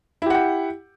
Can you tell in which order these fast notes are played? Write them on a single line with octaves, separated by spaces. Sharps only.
E4 G4 F#5 G5